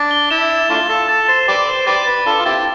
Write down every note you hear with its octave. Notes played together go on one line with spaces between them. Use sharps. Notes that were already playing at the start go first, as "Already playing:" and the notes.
Already playing: D4 A6
G7
E4 E7
E7
A3 D4 F4 G7
A4 A6
A4 A6
C5 A6
G4 B4 D5 E7
C5 G7
G4 B4 D5 A6
B4 A6
D4 F4 A4 G7
F4
C4 E4 G4 A6